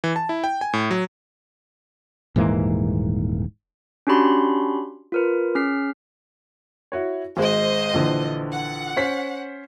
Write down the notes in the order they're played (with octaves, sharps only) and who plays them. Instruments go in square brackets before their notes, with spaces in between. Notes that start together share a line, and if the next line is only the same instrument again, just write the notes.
[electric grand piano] E3
A5
E4
G5
G#5
A2
F#3
[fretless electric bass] D#1 G#2 E3 A#3
[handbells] C#4 D4 F#4 G4 B5 C6
F4 A#4 B4
C#4 G#4 F6 B6 C7
[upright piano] E4 F#4 C#5
[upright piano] G#1 G#3 [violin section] C5 D#5
[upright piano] A#1 D3 E3
[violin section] F#5
[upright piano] C#4 C5 B6